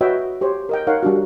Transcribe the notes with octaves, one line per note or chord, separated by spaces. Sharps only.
F#4 B4 C#5 D#5 E5 G5
G4 C5 C#5
A#4 D#5 G5
D#4 A#4 C#5 F5 F#5
G3 D4 F#4